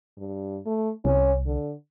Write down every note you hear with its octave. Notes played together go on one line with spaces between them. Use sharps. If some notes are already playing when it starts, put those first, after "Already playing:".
G2
A3
C2 C#4
D3